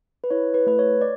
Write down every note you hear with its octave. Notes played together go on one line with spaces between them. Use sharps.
B4
E4 C#5
B4
A3 B4
C#5
D5